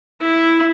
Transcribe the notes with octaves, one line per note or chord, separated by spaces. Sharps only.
E4